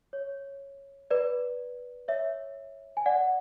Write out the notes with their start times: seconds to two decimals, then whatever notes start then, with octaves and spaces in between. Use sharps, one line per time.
0.13 C#5
1.10 B4 D5
2.08 C#5 E5
2.97 G#5
3.06 D5 F#5